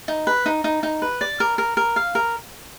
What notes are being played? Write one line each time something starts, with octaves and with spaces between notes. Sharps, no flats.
D#4
B4
D#4
D#4
D#4
B4
D5
A#4
A#4
A#4
F5
A#4